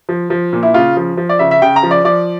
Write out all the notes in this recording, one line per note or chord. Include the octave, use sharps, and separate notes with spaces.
F3
F3
A#2
E4
C#3 F4
F3
F3
D5
C#3 E5
E5
C#3 G5
A#5
F3
D5
F3 D5